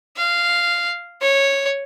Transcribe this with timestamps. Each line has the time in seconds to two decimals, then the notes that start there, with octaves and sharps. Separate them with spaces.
0.17 F5
1.21 C#5